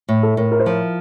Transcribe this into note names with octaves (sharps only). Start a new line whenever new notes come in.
A2
A4
A2 A#4
A#4
C5
F3 A#4